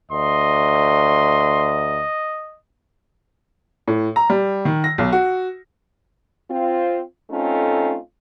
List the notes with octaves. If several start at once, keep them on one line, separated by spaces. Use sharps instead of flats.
D2 D#5 C6
A2
A#5
G3
D#3
A#6
B1
F#4
C4 F4
A3 C4 C#4 D#4 F4 A4